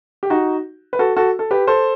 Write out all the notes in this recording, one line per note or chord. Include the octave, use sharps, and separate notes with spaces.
G4
D#4 F#4
B4
F#4 A4
F#4 A4
A4
G4 B4
A4 C5